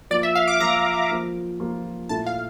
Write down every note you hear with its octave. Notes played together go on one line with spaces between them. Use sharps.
F3 A#3 F4 D5
E5
F5
D6
F3 A#3 F4 A#5
F3 A#3 F4
F3 A#3 F4
A#2 A3 E4 A5
F5